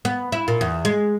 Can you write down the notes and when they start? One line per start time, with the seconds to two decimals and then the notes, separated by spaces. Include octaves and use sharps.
0.05 B3
0.32 E4
0.48 A#2
0.61 E2
0.85 G#3